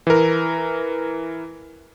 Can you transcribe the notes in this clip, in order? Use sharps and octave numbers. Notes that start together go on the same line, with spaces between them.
E3 A#4